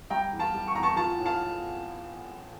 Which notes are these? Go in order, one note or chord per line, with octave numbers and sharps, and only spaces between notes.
G3 G5 A#5
E2
F5 A5
G3
C#6
E2 A#5
A5 C#6
F3 F5 A5
A2
F5 A5